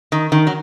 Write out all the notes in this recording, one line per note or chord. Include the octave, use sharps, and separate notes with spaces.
D#3
D#3
F#3